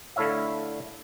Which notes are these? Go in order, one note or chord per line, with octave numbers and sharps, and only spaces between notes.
D3 A3 E4 C#5 E5 F5